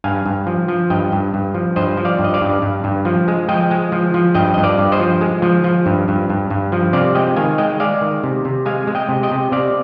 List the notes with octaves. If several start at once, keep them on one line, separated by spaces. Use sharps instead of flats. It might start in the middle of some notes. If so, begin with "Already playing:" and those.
G2 F5 G#5
G2
F3
F3
G2 D#5 G5
G2
G2
F3
G2 C5 D#5
F3
D5 F5
G2
D#5
D5 F5
G2
G2
G2
F3
G#3
F3 D#5 G5
G#3
F3
F3
G2 D#5 G5
G2 D#5
D5 F5
G2
C5 D#5
F3
G#3
F3
F3
G2
G2
G2
G2
F3
C3 D5 F5
G#3 D#5 G5
D#3 F5 G#5
G#3 D#5 G5
G#3 D5 F5
D#3
C3
C3
G#3 F5 G#5
G#3
D#5 G5
C3
D#5 G5
C3
C3 D5 F5